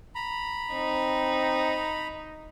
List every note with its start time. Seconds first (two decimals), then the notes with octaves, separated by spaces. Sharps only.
0.15 A#5 B5
0.72 C4 D#4